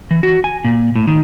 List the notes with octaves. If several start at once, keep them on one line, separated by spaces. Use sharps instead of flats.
E3
F#4
G#5
A#2
A2
D#3